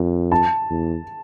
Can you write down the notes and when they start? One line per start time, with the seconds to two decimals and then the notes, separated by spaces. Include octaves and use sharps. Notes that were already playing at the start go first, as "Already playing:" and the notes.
Already playing: F2
0.32 A5
0.70 E2